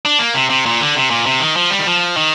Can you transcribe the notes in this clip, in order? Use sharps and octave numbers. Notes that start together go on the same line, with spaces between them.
D4
A#3
C3
C3
A#2
D3
C3
A#2
C3
D#3
F3
G3
D#3
F3
D#3